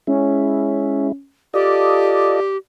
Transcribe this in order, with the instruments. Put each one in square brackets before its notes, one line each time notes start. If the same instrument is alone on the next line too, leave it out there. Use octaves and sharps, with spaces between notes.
[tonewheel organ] G#3 E4 [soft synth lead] C#4
[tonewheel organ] F4 A4 D#5 [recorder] G4 [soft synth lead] D5